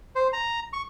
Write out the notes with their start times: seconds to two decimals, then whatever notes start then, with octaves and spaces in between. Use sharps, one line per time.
0.15 C5
0.33 A#5
0.73 C#6